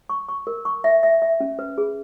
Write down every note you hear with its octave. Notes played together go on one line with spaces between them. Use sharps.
C#6
C#6
A#4
C#6
E5
E5
E5
C#4
B4
G#4